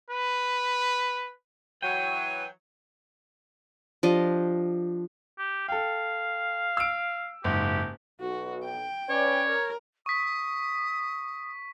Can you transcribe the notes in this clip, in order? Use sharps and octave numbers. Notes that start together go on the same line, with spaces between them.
B4
E3 F#3 G5 D#7
F3 D4 G4 D#5
G4
A4 F5 G5
E6 D7
F#1 G#2 G4
B1 F#4
G5
C#4 B4 C#5 D5
A#4
C#6 D#6 B6